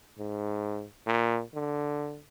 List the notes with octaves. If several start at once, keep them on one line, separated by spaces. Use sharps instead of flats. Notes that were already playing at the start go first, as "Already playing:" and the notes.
G#2
A#2
D3